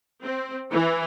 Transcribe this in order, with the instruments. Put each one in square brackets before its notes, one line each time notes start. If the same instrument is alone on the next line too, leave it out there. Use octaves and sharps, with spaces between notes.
[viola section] C4
E3